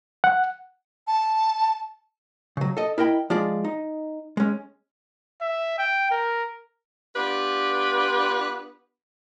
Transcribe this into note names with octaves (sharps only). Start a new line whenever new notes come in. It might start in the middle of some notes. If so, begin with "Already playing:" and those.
F#5
A5
C#3 F#3
A4 D#5
E4 A#4 D#5 G5 B5
F3 G#3 F4 G#4 D5
D#4
G#3 C#4
E5
G5
A#4
B3 D4 F4 G4 B4